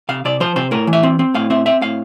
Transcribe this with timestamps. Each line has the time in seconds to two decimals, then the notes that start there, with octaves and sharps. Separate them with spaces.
0.09 C3 F5
0.25 C3 D5
0.40 F3 C5
0.56 C3 C5
0.71 A2 A#4
0.87 E3
0.93 E5
1.03 C4
1.19 C4
1.34 A2 F5
1.50 C4 E5
1.66 C4 E5
1.81 A2 F5